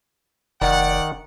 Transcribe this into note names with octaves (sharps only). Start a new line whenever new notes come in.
F1 D#3 D5 F#5